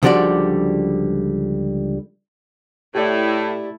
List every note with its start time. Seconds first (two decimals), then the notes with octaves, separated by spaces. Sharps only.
0.03 C#2 D3 F3 G3 F#4 D5
2.95 A2 A3 E4 G4 D5